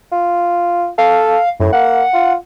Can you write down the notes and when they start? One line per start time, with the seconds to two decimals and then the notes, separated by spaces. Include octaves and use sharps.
0.12 F4
0.98 A4 F5
1.60 F#2 A2
1.73 A#3 F#5
2.14 F4